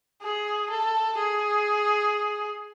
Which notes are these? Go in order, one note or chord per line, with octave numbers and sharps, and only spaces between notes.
G#4
A4
G#4